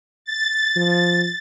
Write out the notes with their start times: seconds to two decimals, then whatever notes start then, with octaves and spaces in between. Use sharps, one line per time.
0.25 A6
0.76 F3